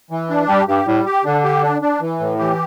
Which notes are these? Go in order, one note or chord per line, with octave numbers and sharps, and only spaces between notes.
E3
D4
G3 G4
G2 G4
A2 G3
G4
D3 D4
G4
D4
D4
E3
A2
E3 G4